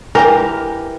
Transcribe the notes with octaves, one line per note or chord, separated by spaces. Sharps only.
E3 G4 A#4 A#5